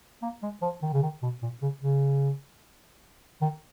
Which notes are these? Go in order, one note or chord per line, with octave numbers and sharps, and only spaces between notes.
A#3
G#3
F3
D#3
C#3
D#3
B2
A#2
C#3
C#3
D#3